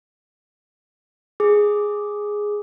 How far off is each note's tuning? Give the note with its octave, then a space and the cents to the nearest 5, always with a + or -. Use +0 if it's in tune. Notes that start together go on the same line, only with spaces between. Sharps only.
G#4 +0 D6 -5